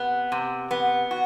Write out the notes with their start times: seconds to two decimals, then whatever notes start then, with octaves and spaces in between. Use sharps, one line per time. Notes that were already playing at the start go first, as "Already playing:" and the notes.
Already playing: C3 B3
0.32 C3
0.71 B3
1.11 F#4